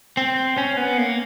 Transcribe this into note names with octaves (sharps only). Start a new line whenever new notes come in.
C4
C#4
B3
A#3